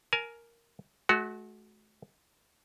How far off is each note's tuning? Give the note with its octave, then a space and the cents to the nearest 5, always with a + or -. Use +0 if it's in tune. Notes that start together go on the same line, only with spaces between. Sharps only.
A#4 +0 G#5 +30
A3 -45 F#4 +0